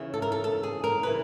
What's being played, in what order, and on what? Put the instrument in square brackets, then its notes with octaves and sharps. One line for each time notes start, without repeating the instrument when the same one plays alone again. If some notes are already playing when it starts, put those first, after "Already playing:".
Already playing: [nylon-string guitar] D#2 C#3 E3
A4
A#4
A4
A4
G#4
A#4
C#3 E3 B4